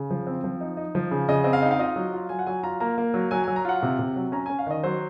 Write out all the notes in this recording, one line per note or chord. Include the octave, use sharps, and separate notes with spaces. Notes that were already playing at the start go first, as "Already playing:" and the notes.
Already playing: C#3
F3
C4
F3
D#4
D#4
F3
C#3
C#3 D#5
C4 D#5
F5
D#4
F5
F4 D#5
F#3
F4
F#3 G#5
F#5
F#3 G#5
F4 A#5
A#3 A#5
A#3
F#3
F#3 G#5
G#5
F#3
A#5
F4 F#5
C3
C3
F#3
C#4 A#5
C#4 G#5
F5
D#3 D#5
F#3 C5